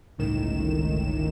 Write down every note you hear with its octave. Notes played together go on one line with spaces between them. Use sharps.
G1 C#2 A2 D#3 E7